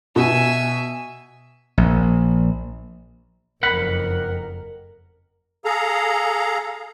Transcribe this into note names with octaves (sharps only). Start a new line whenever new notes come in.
B2 E5 G#5
A#1
F#1 F2 A#4 F#5 B5
G#4 A4 F5 A#5